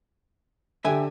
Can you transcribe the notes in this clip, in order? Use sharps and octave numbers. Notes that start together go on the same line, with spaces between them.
D3 G4 E5 G5 G#5